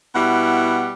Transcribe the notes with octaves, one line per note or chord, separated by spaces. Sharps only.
B2 G3 E4 F#5